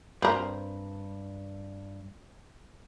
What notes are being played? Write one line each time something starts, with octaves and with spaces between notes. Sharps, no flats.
G2 C4 A#4